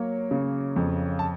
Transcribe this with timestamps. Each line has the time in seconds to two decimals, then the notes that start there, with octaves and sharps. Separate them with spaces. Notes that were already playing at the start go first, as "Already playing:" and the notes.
Already playing: F#3 A#3 C#5
0.31 C#3
0.76 F2
1.19 A5